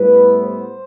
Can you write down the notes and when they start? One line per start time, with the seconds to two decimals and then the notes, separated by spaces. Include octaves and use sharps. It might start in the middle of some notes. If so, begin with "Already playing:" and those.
Already playing: A2 G3 B3 E4 B4
0.40 C5